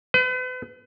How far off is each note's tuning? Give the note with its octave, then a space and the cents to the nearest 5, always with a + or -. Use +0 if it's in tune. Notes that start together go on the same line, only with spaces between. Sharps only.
B4 +40